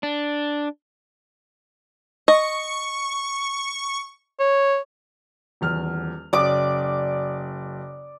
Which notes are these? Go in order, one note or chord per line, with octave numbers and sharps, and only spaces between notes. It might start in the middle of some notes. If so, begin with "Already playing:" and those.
D4
D#5 C#6
C#5
D#1 E2 F6
F#1 D5 D6 D#6